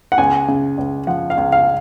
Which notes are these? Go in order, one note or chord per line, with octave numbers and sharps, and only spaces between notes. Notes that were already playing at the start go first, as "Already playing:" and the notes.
F#5
C#2 G#5
C#3
C#2
F3 F#5
F5
C#2
F5